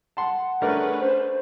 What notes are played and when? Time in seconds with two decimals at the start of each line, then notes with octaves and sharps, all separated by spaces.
0.17 F#5 A5 C6
0.62 A3 C#4 D4 G#4 A#4 B4
1.01 C5